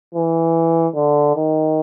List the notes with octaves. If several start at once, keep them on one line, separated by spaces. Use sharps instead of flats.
E3
D3
D#3